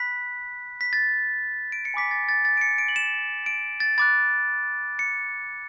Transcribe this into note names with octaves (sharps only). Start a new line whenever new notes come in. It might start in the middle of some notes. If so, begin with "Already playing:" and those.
Already playing: B5 F#6 B6
B6
A6
D7
C#7
G#5 B5 D6 B6
A6
A6
A6
D7
C#7
D7
F#7
E7
D7
A6
B5 D6 F#6 A6
C#7